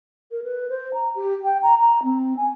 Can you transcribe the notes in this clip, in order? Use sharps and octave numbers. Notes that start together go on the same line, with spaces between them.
A#4
B4
C5
A#5
G4
G5
A#5
A#5
C4
G#5